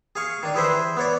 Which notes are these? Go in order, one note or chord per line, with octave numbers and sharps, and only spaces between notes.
G#4 F5 C#6
D#3 D4
E3 G#4 B4 C5 E5
B3 C#5 D5